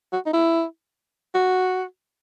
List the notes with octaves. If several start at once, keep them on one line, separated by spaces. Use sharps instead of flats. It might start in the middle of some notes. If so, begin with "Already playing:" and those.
F#4
D#4
E4
F#4